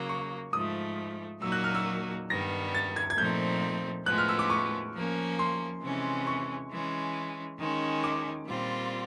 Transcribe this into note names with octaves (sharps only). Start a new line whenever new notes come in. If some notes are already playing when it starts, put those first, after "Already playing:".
Already playing: C#3 F#3 A#3
C#6
G#2 F3 A3 D#6
A#2 F#3 A#3 D#4 F#4 E6
F#6
F6
E6
G2 D#3 G3 B3 A#6
A6
G#6
G#6
A#2 F3 A3 C4 D#4 G6
A2 F3 G#3 B3 F#6
F6
E6
D6
C#6
F3 A#3 C#4
C6
C3 E3 G#3 C#4
C#6
E3 G#3 C#4
D#3 G#3 C#4
D6
A#2 G3 C4 F4